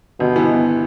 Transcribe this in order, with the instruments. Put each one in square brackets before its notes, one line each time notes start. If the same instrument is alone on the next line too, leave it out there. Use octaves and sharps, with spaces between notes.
[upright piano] G1 [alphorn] B2
[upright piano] E3 B3